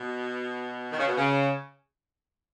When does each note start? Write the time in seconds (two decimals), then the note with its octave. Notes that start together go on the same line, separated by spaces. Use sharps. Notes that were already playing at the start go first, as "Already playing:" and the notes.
Already playing: B2
0.92 D#3
0.99 C#3
1.07 B2
1.15 C#3